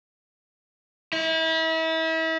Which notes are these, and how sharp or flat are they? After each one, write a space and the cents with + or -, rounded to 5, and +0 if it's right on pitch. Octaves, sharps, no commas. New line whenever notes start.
E4 -35